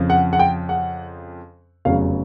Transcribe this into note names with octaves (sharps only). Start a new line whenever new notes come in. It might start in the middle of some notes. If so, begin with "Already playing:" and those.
Already playing: F2 C#3 F3
F#5
F#5
G5
F#5
F1 E2 C#3 F#3 F5